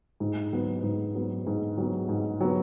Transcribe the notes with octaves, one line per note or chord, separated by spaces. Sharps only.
G#2
F#3 B3
G#2
F#3 B3
G#2
F#3 B3
G#2
F#3 B3